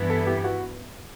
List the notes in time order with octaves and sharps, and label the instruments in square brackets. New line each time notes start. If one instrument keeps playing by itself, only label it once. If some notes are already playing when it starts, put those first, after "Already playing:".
Already playing: [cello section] G2 E3 B3 E4
[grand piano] A4
G4
F#4